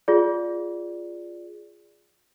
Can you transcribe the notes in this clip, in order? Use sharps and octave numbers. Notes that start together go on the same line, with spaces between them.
F4 G#4 D5